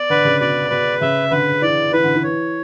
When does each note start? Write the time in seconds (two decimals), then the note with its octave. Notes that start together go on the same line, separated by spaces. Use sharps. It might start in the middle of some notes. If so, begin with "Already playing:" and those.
Already playing: B3 D5
0.10 D3 B4
0.25 C#3
0.40 B2 D5
0.70 B2 B4
1.01 C#3 E5
1.31 D3 B4
1.62 E3 D5
1.92 E3 B4
2.04 D3
2.15 E3
2.23 C#5